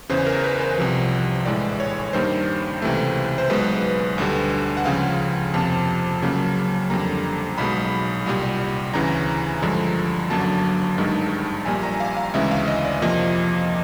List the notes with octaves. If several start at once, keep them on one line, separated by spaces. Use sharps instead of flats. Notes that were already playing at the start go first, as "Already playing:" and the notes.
E2 C#3 E3 C5
A#4
B4
C5
C2 C3 F3
A#1 A2 E3 G#3 D5
C#5
G2 D#3 G3 A#3 C5
C#2 C3 E3 A3
C5
B1 B2 G#3 B4
D2 D3 G3
F#5
C#2 C#3 F3 F5
F2 C3 F3 A#3 A5
C#2 C#3 F#3 A#3
F2 D3 G3 A#3 A#5
B1 B2 G#3 B5
C2 A#2 G3
D2 C#3 E3 A#5
G2 D3 F3 G#3
G1 F#2 D3 F#3 A#3 A5
G#1 G2 D#3 G#3
A#1 A#2 G3 A#3 G#5
A#5
F5
F5
D2 C#3 E3 G#3 E5
F5
D#5
D5
F2 C3 F3 A#3 D#5